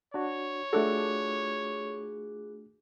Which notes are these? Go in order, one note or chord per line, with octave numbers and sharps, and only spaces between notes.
D4 F#4 C#5
A3 D4 F4 F#4 G#4 A4 F#6